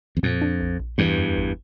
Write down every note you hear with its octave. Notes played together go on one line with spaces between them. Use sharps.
E2
F2 A#2
D4
A#1
A#1
E2 G2 E3
F2
G1